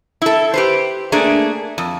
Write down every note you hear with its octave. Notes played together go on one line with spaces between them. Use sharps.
E4 A4
G4 B4 C5
A3 A#3 D4 G#4
F2